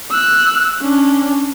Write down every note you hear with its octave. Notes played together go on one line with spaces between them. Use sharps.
E6 F#6
C#4 D4